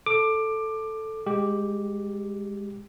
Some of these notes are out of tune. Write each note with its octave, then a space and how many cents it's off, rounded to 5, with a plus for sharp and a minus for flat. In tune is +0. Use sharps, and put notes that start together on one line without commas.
A4 +0 D6 +15
G#3 -20 G4 +0